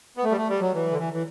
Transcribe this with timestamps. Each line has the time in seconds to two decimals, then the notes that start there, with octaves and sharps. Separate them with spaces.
0.17 B3
0.24 A3
0.31 G3
0.37 A3
0.49 G3
0.61 F#3
0.74 E3
0.92 D3
0.99 E3
1.13 E3